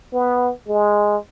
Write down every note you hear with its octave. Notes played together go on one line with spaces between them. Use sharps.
B3
G#3